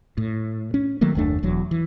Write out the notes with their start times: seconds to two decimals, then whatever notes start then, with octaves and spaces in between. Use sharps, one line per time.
0.17 A2
0.74 C#4
1.01 D#3 F#3 A3 A#3
1.15 F#1 D#2 A3 D4
1.43 E1 E2 F#3
1.71 E3